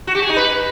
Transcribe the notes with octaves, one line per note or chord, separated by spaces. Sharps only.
F#4
G4
G#4
D#4
B4